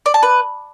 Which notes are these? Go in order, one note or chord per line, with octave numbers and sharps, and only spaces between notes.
D5
A5
B4